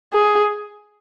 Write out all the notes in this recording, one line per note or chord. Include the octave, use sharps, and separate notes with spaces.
G#4